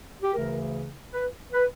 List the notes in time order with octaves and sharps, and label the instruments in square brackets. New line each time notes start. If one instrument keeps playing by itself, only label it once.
[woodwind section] G4
D2 C#3 E3 A#4
B4
B4